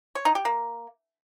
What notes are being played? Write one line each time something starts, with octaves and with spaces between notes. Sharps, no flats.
C#5
D#4
G4
A#3